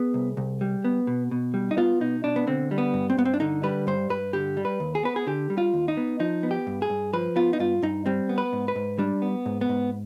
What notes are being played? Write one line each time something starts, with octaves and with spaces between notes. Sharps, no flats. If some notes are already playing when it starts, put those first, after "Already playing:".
Already playing: B3 G#4
C2
C2
G3
B3
B2
B2
G3
D#4
B3 F4
B2 D#4
B2 D4
B3
D3 C4
G3
B3
G2
C4
G2 B3
C4
D4
D3 D#4
G3 B4
G2 C5
G2 B4
D3 G4
G3
B4
D#2
G#4
B3 B4
G#4
D3 G4
G3
F4
D#2
D#4
B3
F3 D#4
B3
G4
G2
G#4
G2
F3 B4
B3 F4
D#4
G2 F4
G2 D#4
G3 C4
B3
B4
G#2
B4
G#2
G3 D4
B3
G#2
B3
G#2